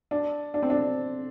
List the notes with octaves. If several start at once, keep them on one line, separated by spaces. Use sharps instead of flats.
D4
D4
C4
D4